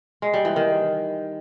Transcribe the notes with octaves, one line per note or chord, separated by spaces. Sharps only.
G#3
G3
E3
D#3